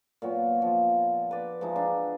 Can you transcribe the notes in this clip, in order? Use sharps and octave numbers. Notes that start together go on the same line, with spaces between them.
A#2 F#3 B3
F3
B4 D5
F3 G#3 D#4 E4
D4 E5